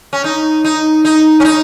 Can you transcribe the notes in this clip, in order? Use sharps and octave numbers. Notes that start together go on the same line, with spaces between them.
C#4
D#4
D#4
D#4
C#4
D#4